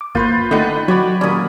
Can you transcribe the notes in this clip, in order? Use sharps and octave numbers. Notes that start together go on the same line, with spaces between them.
D6
G1 A#3 F4 B4 C5 G6
D3 A3 D#4 B4 F#5 G5
F#3 F#4 C#5 D5 B5
D#2 A#2 A#3 C#4 D5 D#6